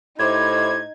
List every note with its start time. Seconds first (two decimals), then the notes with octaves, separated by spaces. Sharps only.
0.19 A2 D#4 E4 G4 C5 G#6